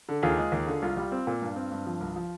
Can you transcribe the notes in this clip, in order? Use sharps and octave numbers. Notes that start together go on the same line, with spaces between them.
D3
D#2 F4 G#4
G#3
D#2
D3
C2 F4
G3
C4
A#2
G2
C4
G2
F3
C2
F3